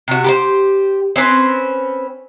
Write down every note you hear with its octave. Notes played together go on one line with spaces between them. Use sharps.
C3 F#4
G4 A#4 C5
C4 C#4 B4 C5